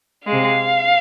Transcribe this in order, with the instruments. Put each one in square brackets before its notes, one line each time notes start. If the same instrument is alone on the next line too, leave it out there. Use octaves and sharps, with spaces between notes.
[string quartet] C3 G#3 F5